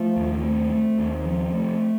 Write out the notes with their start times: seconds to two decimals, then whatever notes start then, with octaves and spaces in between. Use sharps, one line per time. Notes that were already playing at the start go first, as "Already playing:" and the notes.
Already playing: F3 A3
0.17 D#2
0.43 A3 C4
0.71 A3
0.99 D#2
1.25 F3
1.53 A3